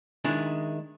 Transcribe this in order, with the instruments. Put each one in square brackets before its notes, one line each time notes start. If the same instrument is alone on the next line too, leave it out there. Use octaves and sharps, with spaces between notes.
[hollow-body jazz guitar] D#3 G#3 D4 E4